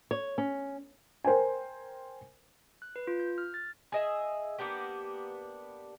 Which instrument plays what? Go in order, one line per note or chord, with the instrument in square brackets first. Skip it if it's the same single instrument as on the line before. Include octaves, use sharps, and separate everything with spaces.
[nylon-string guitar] C#5
C#4
[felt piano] A#4 C5 G5 G#5
[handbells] F#6
B4
F4
G6
F6
A6
[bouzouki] G#4 D#5 E5
A#3 B3 D4 G4